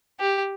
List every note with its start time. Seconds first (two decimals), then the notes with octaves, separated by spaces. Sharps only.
0.20 G4